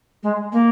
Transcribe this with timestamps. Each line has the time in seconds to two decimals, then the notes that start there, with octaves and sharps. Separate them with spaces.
0.23 G#3
0.52 A#3